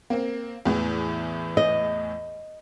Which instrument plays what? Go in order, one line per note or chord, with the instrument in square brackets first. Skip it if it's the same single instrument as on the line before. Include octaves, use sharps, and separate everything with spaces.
[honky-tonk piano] A#3 C4
E2 A2 E3
[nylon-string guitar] D#5